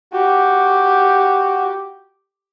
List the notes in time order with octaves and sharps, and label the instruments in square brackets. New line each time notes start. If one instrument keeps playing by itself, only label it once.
[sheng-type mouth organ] F#4 [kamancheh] G4